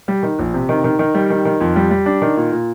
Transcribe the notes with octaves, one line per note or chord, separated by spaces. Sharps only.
G3
D#3
A#1
C3
D#3
D#3
D#3
G3
D#3
D#3
F2
G3
G3
D4
D#3
A#2
A#2